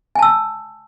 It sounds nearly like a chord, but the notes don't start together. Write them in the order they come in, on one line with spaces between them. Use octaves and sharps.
G#5 A5 E6